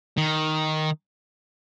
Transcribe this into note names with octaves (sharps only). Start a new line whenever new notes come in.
D#3